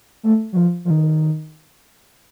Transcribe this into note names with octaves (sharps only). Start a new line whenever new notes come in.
A3
F#3
F3
F3
D#3